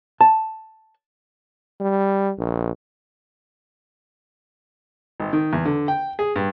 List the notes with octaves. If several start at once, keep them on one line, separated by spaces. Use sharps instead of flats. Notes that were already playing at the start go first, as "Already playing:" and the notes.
A5
G3
A#1
G#1
D#3
E2
D3
G5
G#4
G2